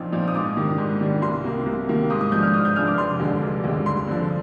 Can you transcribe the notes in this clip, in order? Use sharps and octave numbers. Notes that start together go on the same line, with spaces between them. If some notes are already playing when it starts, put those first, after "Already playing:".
Already playing: A#1 A#2 F3 C4 D#4
A#2 F3 C4 D#4
D#6
G#2 D6
D#3 G3 D4
G#2
D#3 G3 D4
C2 C6
C3 D#3 A#3
C2
C3 D#3 A#3
G#2 D#6
D#6
F3 G#3 D4 G6
F6
G#2 D#6
G6
F3 G#3 D4 F6
D6
F1 C6
D#2 D3 G#3
F1
D#2 D3 G#3
G2 C6
D3 F3